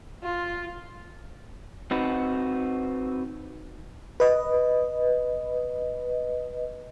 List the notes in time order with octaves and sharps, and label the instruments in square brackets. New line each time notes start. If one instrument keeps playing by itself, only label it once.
[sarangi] F4
[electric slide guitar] C4 D#4 F#4 B4
[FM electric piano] B4 D#5